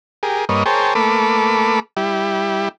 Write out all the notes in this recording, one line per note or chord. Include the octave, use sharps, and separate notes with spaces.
G4 G#4 A#4
G2 A#3 B4 C#5 D#5
G#4 A#4 C5 C#5 G5 A5
A3 A#3 A4 B4 B5 D6
G3 E4 G4